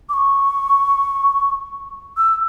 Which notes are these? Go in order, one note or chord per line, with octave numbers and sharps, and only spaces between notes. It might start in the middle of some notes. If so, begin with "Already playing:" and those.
D6
C#6
E6